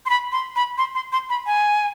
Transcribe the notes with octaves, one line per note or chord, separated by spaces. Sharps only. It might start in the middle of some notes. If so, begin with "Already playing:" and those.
C6
B5
C6
B5
C6
C6
C6
B5
G#5